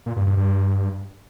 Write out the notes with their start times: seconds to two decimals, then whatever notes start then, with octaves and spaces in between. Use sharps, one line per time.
0.06 A#2
0.16 G2
0.27 G2
0.37 G2